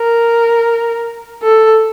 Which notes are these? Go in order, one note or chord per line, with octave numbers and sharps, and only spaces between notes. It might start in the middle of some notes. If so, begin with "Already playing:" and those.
Already playing: A#4
A4